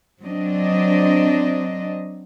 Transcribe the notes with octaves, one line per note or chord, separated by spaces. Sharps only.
F#3 C4 D4 D#5